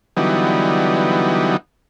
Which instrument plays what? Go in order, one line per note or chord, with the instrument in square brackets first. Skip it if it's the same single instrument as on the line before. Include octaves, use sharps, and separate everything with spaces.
[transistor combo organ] D3 E3 F#3 G3 B3 D#4